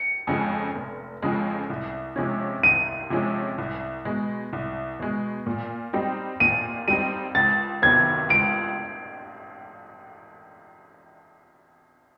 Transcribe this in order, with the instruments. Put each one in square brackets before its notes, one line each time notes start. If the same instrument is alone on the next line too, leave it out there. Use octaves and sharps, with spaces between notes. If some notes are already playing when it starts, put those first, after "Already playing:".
Already playing: [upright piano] C#7
[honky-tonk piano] F2 C#3 F3 G#3
F1
F2 C#3 F3 G#3
C2
C3 F3 G#3 C#4
[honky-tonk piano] C2 [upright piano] D#7
[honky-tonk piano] C3 F3 G#3 C#4
C2
B2 G#3
C2
B2 G#3
A#2
G3 C4 D#4
[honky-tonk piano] A#2 [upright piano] D#7
[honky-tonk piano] G3 C4 D#4 [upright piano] D#7
[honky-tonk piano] C#2 [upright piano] A6
[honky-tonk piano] C3 D#3 F#3 B3 [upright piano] G#6
[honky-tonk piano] C#2 [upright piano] D7